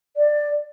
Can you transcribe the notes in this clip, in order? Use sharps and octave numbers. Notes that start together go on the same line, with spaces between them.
D5